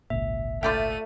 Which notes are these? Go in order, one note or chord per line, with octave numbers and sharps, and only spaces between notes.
G#1 C#2 A#2 E5
A3 F4 D5 E5 G5 D#7